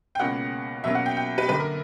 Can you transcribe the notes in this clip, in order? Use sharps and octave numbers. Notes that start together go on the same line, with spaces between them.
G5
C#2 B2 A#3 C#4 F#5
B2 F#3 A#3 C#4 E5
F#5
G5
G5
B4
F#2 D3 A#3 B4
A#4